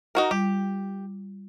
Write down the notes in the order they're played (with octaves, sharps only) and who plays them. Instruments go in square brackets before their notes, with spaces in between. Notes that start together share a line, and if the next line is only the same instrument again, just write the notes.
[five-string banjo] D#4 F#4 A#4
[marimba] G3 F4 [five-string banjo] G4